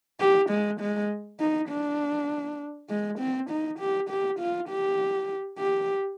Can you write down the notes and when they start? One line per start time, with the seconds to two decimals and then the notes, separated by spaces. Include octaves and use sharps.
0.20 G4
0.50 G#3
0.81 G#3
1.40 D#4
1.69 D4
2.90 G#3
3.19 C4
3.50 D#4
3.79 G4
4.10 G4
4.40 F4
4.70 G4
5.59 G4